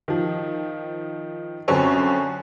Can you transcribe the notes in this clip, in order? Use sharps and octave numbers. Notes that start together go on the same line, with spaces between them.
D#3 F3
F#2 D3 C4 C#4 C#6